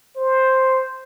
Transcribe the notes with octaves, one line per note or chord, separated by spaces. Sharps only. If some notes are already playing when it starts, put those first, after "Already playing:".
C5